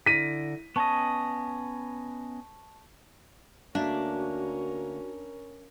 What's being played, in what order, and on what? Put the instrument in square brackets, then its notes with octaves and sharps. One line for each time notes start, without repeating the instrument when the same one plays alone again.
[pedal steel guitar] D3 [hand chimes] E4 A#6 [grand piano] B6 D#7
[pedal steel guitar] B3 C#4 D#5 [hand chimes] A5 C#6
[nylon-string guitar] D2 A#3 E5 [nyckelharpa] C#4 A#4 [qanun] D4 [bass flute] F#4